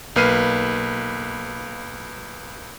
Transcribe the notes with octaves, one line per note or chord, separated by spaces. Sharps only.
B1 A#3 B4 F6 C7 D#7